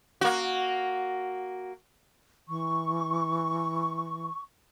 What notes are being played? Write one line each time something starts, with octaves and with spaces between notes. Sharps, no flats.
A#3 F#4
E3 C#6